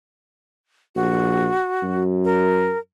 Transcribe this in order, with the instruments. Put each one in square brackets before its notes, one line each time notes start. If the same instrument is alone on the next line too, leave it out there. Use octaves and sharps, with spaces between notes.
[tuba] A#1 [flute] F#4
[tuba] F#2
[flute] A#4